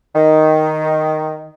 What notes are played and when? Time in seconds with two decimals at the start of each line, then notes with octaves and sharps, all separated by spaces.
0.15 D#3